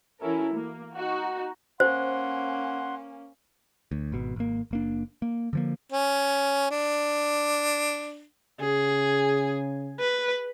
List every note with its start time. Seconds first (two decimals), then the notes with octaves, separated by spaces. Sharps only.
0.20 E3 C#4 E4 F#4 A4 A#4
0.53 A#3
0.96 D#4 F#4
1.80 A#3 C#4 C5 F#5 C6
3.91 D2
4.12 G#1 B2
4.36 G#1 A#3
4.71 F#1 A#3 D4
5.22 A#3
5.53 D3 F3 A#3
5.92 C#4
6.71 D4
8.61 C#3 G#4
10.00 B4